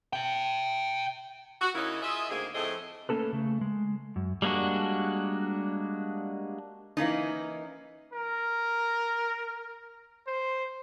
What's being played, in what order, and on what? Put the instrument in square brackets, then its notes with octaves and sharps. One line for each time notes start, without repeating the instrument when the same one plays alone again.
[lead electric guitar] E5 G5
[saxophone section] F#4
C#3 A#3 C#4 D#4 E4
F4 G#4 D#5 E5
D2 G#2 A#3 C4 G#4
F2 A2 A3 C4 G#4 D#5
[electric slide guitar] A3 A#3 C#4 A4 B4
C#3 A3
G#3
F#2
[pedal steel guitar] G3 G#3 A#3 D4 F#4
[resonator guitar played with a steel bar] E3 A#3 C#4 D#4
[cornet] A#4
C5